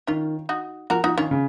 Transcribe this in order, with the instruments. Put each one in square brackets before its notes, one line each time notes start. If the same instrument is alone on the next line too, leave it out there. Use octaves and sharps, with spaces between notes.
[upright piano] D#3 [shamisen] C#4 F4
[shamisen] D#4 F#4
[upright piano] F3 [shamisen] F#4 A#4
[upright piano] F3 [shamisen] D#4 F#4
[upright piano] D#3 [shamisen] C#4 F4
[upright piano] C#3